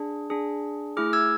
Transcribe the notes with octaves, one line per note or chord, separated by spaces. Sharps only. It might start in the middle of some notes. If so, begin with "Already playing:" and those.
Already playing: D4 G#4
D4 G#4
A3 E4 G#4 D6 F6
E6 G#6